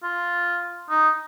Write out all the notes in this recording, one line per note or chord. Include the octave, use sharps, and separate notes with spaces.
F4
D#4